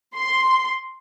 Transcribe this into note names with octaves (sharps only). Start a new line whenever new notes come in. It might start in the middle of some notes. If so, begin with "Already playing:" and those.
C6